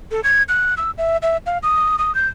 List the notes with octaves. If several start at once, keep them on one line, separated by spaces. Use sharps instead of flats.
A4
G#6
F#6
E6
E5
E5
F5
D#6
D#6
G6